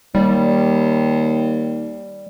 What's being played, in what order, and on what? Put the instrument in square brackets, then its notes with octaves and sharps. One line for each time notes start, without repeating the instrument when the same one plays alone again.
[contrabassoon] D#2 [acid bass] G3